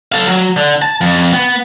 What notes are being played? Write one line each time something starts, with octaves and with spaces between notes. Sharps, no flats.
A4 F5
F#3
D3
A5
F2
B3